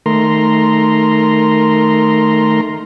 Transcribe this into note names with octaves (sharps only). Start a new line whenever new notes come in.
D#3 A3 A#4 A#5 C6